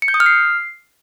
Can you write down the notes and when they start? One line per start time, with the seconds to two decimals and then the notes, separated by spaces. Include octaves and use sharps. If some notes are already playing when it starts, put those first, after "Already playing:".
0.02 C#7
0.08 G6
0.14 D#6
0.20 F6
0.26 C7